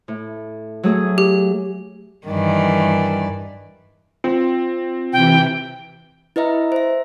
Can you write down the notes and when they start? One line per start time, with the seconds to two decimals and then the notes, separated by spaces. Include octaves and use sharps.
0.08 A2
0.83 F#3 A3 G#4
1.18 G4
2.27 G2 D#3 E3 D5
4.24 C4 F4
5.13 C3 E3 G5
6.36 E4 B4 D#5 E5 A#5
6.72 C5 E5